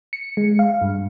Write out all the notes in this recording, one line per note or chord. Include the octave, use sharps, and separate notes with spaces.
C#7
G#3
F5
G2